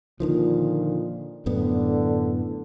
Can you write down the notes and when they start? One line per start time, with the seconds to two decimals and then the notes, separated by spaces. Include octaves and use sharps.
0.20 A#2 D3 D#3 F3
1.46 F#2 A2 D3 B3